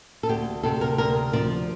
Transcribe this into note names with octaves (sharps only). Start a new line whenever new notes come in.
A4
D2 G4
C3 A4
A#4
D2 A#4
F3 D5